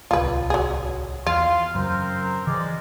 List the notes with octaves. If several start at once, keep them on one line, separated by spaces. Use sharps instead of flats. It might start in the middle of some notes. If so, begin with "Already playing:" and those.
D1 C2 F4 B4
F#3 G#4
E2 F4 F5 C6
F#2 C#3 C4 A#4 C5
C#3 E3 G#3 D5